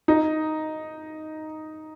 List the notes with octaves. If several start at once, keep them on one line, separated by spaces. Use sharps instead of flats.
D#4